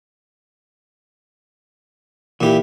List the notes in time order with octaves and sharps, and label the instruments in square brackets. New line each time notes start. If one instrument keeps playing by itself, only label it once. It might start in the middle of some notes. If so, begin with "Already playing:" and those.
[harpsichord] A#2 G4 [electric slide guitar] E3 E4